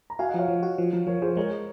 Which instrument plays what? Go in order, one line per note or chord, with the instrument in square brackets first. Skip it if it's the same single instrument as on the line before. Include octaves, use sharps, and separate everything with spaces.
[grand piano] A#5
[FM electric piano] F#4 [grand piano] F5 G#5
[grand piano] D#5 F#5
[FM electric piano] F3 [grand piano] C#5 F5
[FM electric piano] F3
F#4
F3
F3
[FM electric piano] F3 [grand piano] A#4 C#5
[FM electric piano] F3 [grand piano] G#4 C5
[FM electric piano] G#3 [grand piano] A#4 C#5